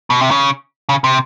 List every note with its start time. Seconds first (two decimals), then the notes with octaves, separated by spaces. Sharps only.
0.10 B2
0.21 C3
0.31 C#3
0.89 C#3
1.04 C3